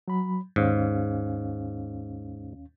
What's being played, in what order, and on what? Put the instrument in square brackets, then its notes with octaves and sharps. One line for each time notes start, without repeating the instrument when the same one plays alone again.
[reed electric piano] F#3 B5
[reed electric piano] D#2 C#4 F5 [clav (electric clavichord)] G#2